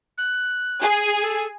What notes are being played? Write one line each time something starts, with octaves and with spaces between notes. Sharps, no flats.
F#6
G#4
A4